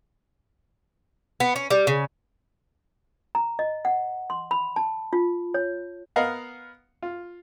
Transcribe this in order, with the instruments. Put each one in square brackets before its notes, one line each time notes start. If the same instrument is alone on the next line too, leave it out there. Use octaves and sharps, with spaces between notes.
[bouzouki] B3
C#4
G3
C#3
[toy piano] A#5
D#5
F#5
C6
B5
A5
F4
C#5
[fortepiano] B3 A#4 D#5 F5 F#5
F4